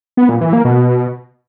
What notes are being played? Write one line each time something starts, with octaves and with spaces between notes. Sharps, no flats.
B3
A#2
E3
A#3
B2